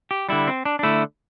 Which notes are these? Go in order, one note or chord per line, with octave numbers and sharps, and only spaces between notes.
G4
D3 G3 E4
C4
D4
D4
D3 A3 E4